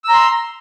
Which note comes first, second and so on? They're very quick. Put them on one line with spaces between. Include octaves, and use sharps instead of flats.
E6 A#5 C6